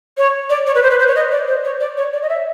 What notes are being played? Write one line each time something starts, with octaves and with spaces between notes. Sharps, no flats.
C#5
D5
C#5
B4
C5
B4
C5
C#5
D#5
D5
C5
C#5
D5
C#5
D5
D#5
E5